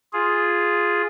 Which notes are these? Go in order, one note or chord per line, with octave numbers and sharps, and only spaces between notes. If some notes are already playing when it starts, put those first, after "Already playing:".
F4 G#4